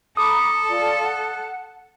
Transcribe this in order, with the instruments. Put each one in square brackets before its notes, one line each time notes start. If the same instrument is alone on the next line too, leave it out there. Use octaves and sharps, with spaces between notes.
[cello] A4 [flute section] A#5 B5 D6 [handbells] D#6
[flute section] F4 D5
F#5